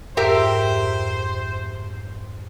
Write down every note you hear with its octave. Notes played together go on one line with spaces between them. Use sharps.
F2 G#2 G4 A#4 C5 E5